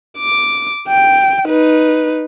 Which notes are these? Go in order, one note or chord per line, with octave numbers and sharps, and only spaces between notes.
D6
G5
D#4 B4